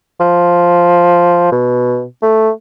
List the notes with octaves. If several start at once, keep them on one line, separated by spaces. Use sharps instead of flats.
F3
B2
A3